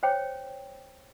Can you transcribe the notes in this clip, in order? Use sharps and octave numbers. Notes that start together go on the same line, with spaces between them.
C5 C#5 G5